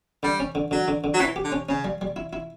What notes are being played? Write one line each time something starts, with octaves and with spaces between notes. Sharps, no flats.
D3 G3
C#4
D3
D3 F#3
D3
D3
F#3
E3 C#4
G4
D3
C#4
C#3 C#4
G3
G3
E4
E4